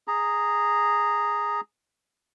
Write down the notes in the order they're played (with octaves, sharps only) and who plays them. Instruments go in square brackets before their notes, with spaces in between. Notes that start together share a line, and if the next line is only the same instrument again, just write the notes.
[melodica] G#4 A#5